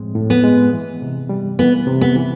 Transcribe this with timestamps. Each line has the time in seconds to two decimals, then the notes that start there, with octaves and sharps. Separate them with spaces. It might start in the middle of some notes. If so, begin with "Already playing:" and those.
Already playing: A2 F3 G#3 C4
0.15 A2
0.30 B3
0.44 G#3
0.73 E3
1.02 C3
1.29 G3
1.59 E3 B3
1.87 C3
2.01 B3
2.16 E3